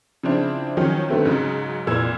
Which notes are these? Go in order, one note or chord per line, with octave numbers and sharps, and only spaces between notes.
C#3 F3 C4 D4 E4
D#3 F3 F#3 C#4
D3 D#3 F#3 A3 B3 C4
G#2 C#3 F#3
F1 A#2 E3 E6 G#6